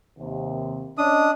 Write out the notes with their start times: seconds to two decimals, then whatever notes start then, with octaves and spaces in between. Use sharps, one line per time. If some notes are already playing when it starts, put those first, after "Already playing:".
0.19 D#2 C3
0.98 C#4 D4 D#5 D#6